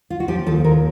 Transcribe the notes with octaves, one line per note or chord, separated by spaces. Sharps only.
F4
F#4
F3 G4
D#2 A4
D#2 A#4